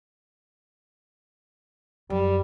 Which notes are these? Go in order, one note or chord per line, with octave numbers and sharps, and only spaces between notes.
F#2 G3